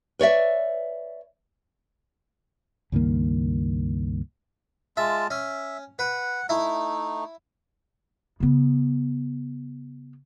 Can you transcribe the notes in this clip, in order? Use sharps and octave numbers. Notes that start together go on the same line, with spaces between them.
B4 C#5 D5 E5
C#2 G2 D#3 A#3
G#3 F4 E5 A5
C#4 E5
B4 F#5
A3 D#4 E4
C#3 B3